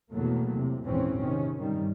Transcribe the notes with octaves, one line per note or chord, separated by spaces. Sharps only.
E2 B2 F#3 A3 A#3
C3
G#1 E2 A#2 E3 C4 C#4
C3 D#3 C#4
G2 D#3 G3